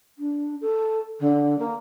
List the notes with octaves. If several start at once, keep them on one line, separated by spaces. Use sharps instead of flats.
D4
A4
D3
A#3